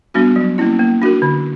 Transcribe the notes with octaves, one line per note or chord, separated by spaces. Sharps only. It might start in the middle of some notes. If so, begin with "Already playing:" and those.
G3 B3 D4 F#4
F#3
A#3 C#4 E4
A#3
D4 F#4 A#4
D3